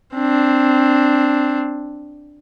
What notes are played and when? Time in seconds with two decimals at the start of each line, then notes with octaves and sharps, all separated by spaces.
0.15 C4 D4